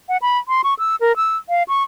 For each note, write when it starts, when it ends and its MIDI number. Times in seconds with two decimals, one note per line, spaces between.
0.09 0.17 78
0.22 0.38 83
0.48 0.62 84
0.64 0.74 85
0.79 0.96 88
1.01 1.16 70
1.16 1.37 88
1.49 1.63 77
1.68 1.83 85